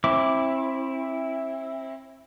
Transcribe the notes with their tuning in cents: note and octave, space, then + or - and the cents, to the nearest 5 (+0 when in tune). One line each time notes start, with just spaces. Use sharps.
C4 +35 E4 -5 D6 +0